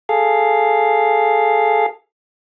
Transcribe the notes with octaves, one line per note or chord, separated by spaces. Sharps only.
G#4 A4 F5